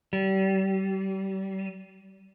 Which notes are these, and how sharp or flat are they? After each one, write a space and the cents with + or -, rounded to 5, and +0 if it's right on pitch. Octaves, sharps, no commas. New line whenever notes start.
G3 -30